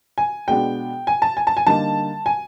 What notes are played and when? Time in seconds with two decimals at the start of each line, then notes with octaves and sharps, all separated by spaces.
0.18 G#5
0.48 B2 G#3 B3 D4 G5
1.07 G#5
1.22 A5
1.37 G#5
1.47 A5
1.57 G#5
1.67 D3 G3 A#3 D#4 A5
2.26 G#5